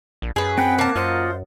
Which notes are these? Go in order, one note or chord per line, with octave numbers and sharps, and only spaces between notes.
A#1
F#2 G#4 B4
C4 F#5 G5 B5
A#3 A#4 A5
F#2 F4 C5 D#5 F#5